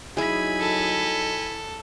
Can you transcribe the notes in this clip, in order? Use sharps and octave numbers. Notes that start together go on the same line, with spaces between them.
F#3 D#4 E4 G#4 G#5 B5
A4